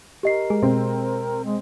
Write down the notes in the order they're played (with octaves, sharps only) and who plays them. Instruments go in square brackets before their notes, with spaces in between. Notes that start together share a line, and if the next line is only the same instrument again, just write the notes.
[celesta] G4 D#5 C7 [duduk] A#4
[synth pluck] G#3 G#4
[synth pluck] B2 [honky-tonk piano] C4
[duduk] G#3